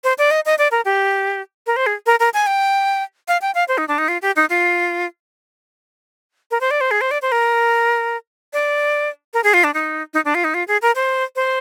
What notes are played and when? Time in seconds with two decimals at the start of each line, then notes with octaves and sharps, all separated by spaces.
0.04 C5
0.18 D5
0.31 D#5
0.46 D#5
0.59 D5
0.72 A#4
0.85 G4
1.67 A#4
1.76 C5
1.86 G#4
2.06 A#4
2.20 A#4
2.34 G#5
2.47 G5
3.28 F5
3.42 G5
3.55 F5
3.68 C5
3.78 D#4
3.88 D4
3.98 D#4
4.08 F4
4.22 G4
4.36 D#4
4.50 F4
6.51 A#4
6.61 C5
6.71 D5
6.81 C5
6.91 G#4
7.01 C5
7.11 D5
7.22 C5
7.32 A#4
8.53 D5
9.34 A#4
9.44 G#4
9.54 F4
9.64 D4
9.74 D#4
10.14 D#4
10.25 D4
10.35 F4
10.44 D#4
10.54 F4
10.68 G#4
10.82 A#4
10.95 C5
11.36 C5